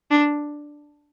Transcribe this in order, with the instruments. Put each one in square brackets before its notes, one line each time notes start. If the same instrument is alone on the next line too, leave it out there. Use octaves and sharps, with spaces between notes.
[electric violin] D4